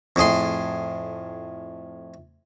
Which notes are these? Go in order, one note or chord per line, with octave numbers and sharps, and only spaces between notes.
F2 A2 G#4 C6